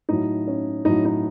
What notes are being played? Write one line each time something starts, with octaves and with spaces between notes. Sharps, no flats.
A2 F#3 D#4
C#4
A2 F#3 D#4
D#4